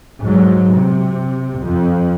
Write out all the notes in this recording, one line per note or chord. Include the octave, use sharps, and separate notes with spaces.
G#2 F#3
C3
F2